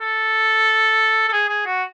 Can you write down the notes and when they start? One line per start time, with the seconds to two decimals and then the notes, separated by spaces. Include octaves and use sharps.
0.01 A4
1.28 A4
1.33 G#4
1.49 G#4
1.66 F#4